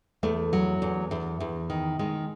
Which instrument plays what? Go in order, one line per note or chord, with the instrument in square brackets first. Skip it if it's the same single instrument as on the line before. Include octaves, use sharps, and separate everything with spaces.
[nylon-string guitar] E2 A3
F#3
E2
E2
E2
D#3
D#3 G#3